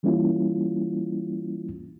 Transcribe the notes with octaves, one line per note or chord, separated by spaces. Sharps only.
E3 G3 A#3 C#4 E4 F4